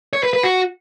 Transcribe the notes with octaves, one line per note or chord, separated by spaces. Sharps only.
C#5
B4
B4
F#4